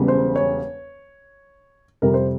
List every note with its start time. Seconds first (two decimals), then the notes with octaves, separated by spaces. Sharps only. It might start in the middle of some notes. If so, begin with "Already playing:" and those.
Already playing: E1 E2 C#3 G3
0.08 C5
0.36 C#5
2.02 F2 C3 G3 A#4
2.14 C5